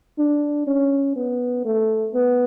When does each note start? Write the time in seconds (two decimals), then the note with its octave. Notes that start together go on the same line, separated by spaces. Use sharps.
0.18 D4
0.67 C#4
1.16 B3
1.65 A3
2.14 B3